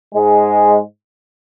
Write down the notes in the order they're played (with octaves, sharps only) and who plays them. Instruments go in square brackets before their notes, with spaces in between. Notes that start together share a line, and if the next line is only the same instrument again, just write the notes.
[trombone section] G#2 G#3